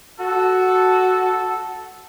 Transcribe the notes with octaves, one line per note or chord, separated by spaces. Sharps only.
F#4 A4